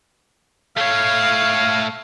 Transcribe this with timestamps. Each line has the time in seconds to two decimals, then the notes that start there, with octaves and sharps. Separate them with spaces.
0.77 A3 C#5 F5